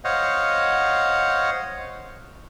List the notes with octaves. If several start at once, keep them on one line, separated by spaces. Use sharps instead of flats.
C5 C#5 D#5 F5 F#5